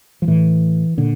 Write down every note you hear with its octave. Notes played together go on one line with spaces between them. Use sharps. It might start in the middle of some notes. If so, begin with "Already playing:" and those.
F3
A2 E3
A#2 D3